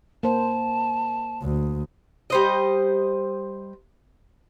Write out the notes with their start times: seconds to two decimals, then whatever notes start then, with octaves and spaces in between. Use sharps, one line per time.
0.23 A#3 C5 A5
1.42 D2
2.30 G3 C5 D#5